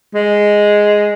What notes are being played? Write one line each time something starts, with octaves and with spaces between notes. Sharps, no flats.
G#3